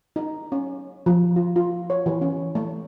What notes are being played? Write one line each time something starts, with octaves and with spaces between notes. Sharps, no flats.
D#4
C#4
F3
F4
F4
C#5
E3
C#4
A3